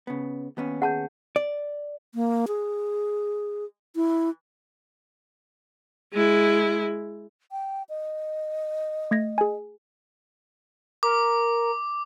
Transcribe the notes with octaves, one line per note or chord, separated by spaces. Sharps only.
C#3 B3
D#2 B3 C#4
G#4 F#5 A5 G6
D5
A#3
G#4
E4
G#3 E4
G5
D#5
A3 G#6 A#6
G#4 G#5
A#4 D6